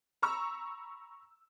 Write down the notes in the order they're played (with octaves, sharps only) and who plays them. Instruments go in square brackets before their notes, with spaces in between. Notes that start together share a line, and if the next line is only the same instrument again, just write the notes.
[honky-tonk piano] A#5 B5 C#6 E6